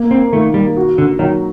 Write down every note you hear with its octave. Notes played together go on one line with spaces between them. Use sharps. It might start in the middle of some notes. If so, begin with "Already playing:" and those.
Already playing: A#3
C4
D#3 A3
G3
F#4
D3
D#3 F#3